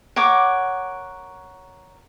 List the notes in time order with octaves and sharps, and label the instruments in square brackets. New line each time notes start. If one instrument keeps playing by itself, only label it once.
[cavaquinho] A#4 C#5 F#5 D6